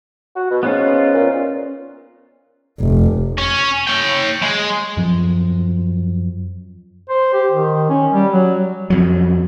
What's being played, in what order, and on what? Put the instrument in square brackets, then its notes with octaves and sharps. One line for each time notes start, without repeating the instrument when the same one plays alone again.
[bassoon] F#4
B2
[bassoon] G#2 [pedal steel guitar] B3 C#4 F4
[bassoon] A#2
[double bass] F1
[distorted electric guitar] C#4
C#5 G5
G#3
[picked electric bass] F#2 F3
[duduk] C5
G4
D#3
C#4
G3
F#3
[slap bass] F2 F#3